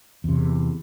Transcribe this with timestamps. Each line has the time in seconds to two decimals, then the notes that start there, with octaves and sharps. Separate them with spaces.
0.24 E2 C3